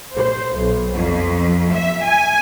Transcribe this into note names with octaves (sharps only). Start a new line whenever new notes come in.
C5
B1
F2
E5
G#5